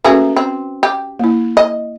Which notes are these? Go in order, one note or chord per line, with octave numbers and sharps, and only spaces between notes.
A3 A#3 C#4 F#4 G#4 B4
C4
G4
A#3 E4
D#5